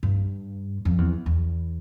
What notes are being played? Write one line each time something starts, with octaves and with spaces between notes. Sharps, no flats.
G2
F2
E2
E2